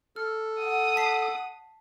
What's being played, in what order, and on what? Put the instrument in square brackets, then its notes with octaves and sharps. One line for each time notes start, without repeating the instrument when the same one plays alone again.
[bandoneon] A4 [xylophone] F6
[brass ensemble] F#5 [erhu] D#6
[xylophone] A5 B6 C7